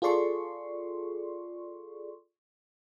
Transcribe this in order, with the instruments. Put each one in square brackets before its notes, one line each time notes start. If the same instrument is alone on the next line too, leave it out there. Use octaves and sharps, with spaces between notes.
[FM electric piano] F4 G#4 A4 D5 C6 C#6